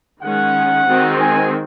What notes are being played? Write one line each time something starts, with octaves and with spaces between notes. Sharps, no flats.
D#3 G#3 C#4 F#5
D#3 G#3 C4 F#4
G#5